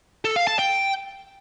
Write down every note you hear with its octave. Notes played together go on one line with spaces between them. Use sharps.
A4
F5
A5
G5